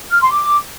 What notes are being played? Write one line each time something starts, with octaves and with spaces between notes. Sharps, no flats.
F6
C6
D6